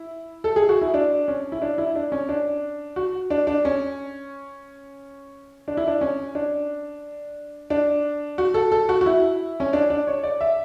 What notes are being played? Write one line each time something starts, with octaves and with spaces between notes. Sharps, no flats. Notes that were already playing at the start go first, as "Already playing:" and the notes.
Already playing: E4
A4
G#4
F#4
E4
D4
C#4
E4
D4
E4
D4
C#4
D4
F#4
D4
D4
C#4
D4
E4
D4
C#4
D4
D4
F#4
A4
A4
F#4
F#4
E4
C#4
D4
D4
C#5
D5
E5